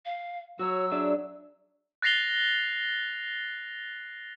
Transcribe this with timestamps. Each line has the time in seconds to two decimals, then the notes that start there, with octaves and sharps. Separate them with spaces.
0.05 F5
0.59 F#3 F#4 C#5 E6
0.92 D4 G#4 D5 E5
2.02 F#6 A6 A#6 C7 F7 G7